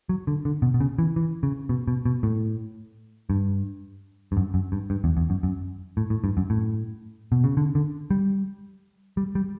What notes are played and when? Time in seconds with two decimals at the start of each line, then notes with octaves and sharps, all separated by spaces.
0.09 F#3
0.27 D3
0.45 D3
0.62 B2
0.74 B2
0.80 C#3
0.99 E3
1.16 E3
1.43 C#3
1.69 B2
1.88 B2
2.05 B2
2.23 A2
3.30 G2
4.32 G2
4.37 F#2
4.54 F#2
4.72 G2
4.90 G2
5.04 E2
5.17 E2
5.30 F#2
5.43 F#2
5.97 A2
6.10 A2
6.24 G2
6.37 F#2
6.50 A2
7.32 B2
7.44 C#3
7.57 D3
7.75 D3
8.11 G3
9.17 G3
9.35 G3